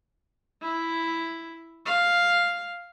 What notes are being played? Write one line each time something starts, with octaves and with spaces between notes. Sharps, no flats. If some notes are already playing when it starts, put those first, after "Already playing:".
E4
F5